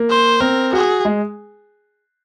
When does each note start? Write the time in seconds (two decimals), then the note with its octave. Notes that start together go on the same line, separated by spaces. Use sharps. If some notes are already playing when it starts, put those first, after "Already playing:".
Already playing: A#3
0.10 C5
0.41 C4 A#4
0.73 F#4 G#4
1.05 G#3